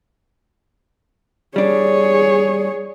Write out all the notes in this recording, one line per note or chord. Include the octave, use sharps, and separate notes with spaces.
G3 D4 G#4 C#5